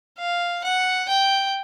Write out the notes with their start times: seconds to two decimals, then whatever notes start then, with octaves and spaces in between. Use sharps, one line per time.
0.19 F5
0.64 F#5
1.09 G5